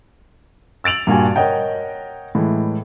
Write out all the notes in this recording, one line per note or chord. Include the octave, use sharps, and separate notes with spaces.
E6 A6 D7 F7 F#7
G2 A#2 F#4 G#5
A#4 C#5 D#5 F#5 G5
A2 E3 G#3